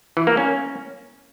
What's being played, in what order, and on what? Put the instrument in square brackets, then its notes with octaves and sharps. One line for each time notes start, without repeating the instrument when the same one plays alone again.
[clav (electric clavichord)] E3
A#3
C#4